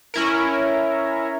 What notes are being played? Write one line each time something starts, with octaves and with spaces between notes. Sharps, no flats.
C#4 E4 A#4